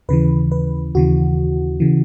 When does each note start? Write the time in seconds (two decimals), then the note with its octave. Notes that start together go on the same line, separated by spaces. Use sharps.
0.09 D#2 C#3 E3 B4
0.52 B4
0.95 D#2 C#3 E3 F#4
1.80 C#3 E3